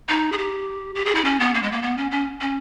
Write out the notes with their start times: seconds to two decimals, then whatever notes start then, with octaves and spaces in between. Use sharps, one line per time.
0.09 D#4
0.32 G#4
0.38 G4
0.95 G4
1.05 G#4
1.15 E4
1.24 C#4
1.40 B3
1.54 A#3
1.63 G#3
1.72 A#3
1.82 B3
1.97 C#4
2.11 C#4
2.41 C#4